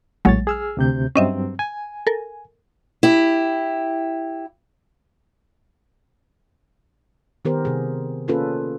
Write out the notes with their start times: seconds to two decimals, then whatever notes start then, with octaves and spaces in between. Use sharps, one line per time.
0.25 A#1 A2 F#3 G#3 C#5 A6
0.47 G#4 E6 F6
0.77 D2 C3 G6
1.16 G2 F#3 C4 C#4 D#5 E5
1.59 G#5
2.07 A4 A#4
3.03 E4 G4
7.45 D#3 B3 G4 A#4 C5
7.65 C3 G#4
8.28 A#3 C#4 F4 G#4 A4 B4